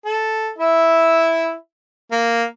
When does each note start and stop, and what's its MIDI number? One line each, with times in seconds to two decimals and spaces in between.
0.05 0.50 69
0.58 1.53 64
0.58 1.53 76
2.11 2.44 58